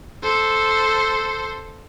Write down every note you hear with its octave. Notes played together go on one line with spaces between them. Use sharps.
A4 C5